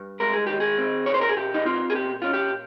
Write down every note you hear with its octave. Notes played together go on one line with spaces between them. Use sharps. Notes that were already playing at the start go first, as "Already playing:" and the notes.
Already playing: G2
G#3 A#4
G#4
D#3 G4
G#4
C4
A#2 C#5
C5
A#4
G#4
A#2 G4
D#4
C4 F4
G#4
A#2 G4
C#4 F4
G4